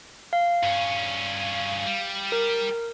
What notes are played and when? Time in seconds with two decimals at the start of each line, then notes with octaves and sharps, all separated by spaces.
0.33 F5
0.63 G2 C#4
1.87 G3
2.32 A#4